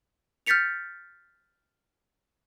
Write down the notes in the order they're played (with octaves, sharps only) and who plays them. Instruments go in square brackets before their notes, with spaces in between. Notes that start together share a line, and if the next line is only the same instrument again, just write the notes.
[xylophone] F6 G6 A6 B6 C#7 F7